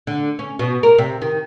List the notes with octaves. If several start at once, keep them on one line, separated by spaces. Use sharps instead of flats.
D3
C#4
B2
A#4
C3
D#3